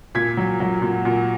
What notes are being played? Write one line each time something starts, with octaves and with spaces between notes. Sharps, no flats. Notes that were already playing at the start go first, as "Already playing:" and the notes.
A#2 G#6 B6
F#3
F#3
A#2
A#2